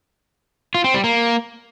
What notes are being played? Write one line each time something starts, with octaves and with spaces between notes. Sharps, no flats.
F4
C4
G3
A#3